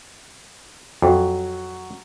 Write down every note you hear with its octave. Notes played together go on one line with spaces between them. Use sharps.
F2 F#3